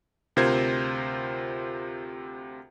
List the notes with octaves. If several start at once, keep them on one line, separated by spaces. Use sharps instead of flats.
D2 C3 F4 A#4 C5 G#6